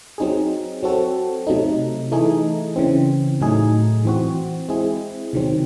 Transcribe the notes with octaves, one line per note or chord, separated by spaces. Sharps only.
F#3 C4 D#4 G#4
F#3 C4 F#4 A4
C3 F#3 A3 D#4
E3 A3 D#4 G#4
C#3 E3 C4
A2 F#3 A3 D#4 G#4
E3 C4 F#4
G#3 C4 E4 G#4
C3 D#3 F#3 C4